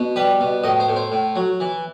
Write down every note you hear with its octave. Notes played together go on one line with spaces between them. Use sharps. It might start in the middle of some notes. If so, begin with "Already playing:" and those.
Already playing: B2
G3 B4
B2
A2 D#5
C5
A2
C5
A2
F#3
E3